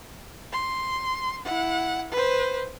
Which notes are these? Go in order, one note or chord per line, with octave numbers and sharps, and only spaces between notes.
C6
E4 F#5
B4 C5